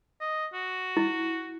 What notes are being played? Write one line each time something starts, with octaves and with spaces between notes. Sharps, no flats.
D#5
F#4
E4